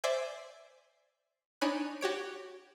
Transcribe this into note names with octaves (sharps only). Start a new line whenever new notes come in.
C5 D5 E5 G#5 G6
D4 D#4 C#5 G#5 B5 F#6
F#4 G4 C#5 D7